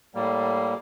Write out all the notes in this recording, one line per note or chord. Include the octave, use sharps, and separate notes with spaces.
A2 G3 A#3